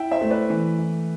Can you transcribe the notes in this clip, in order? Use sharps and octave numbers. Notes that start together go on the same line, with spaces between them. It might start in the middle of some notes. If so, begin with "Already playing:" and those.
Already playing: E4 E5 G5
C5 E5
A3
B4 D5
E3
E3